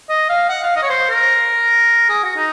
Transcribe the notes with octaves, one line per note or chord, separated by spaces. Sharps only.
D#5
F5
F#5
F5
D#5
C#5
C5
A#4
G#4
F#4
D#4